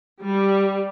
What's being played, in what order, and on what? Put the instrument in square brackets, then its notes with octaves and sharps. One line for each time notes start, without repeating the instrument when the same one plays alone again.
[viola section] G3